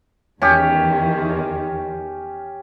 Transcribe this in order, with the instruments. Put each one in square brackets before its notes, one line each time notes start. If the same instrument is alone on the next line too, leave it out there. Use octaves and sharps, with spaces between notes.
[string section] E2 D#3 [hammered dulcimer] C#4 G4